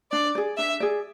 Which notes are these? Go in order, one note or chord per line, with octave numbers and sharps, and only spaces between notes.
D4 D5
G#4 D5
D4 E5
G#4 D5